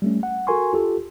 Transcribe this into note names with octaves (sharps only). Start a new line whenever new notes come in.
G3 A3 C#4
F#5
F#4 A4 A#4 G#5 C6 C#6
F4 G4 A4